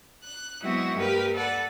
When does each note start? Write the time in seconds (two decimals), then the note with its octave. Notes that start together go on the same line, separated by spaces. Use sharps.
0.24 F#6
0.62 F#3 G#3 B3 C4 E4 F#4
0.95 G2 A#3 G4 A#4 B4
1.34 A4 B4 D5 F#5